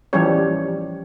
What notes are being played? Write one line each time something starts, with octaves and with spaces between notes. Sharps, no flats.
E3 F3 G3 C#4 G4 C#5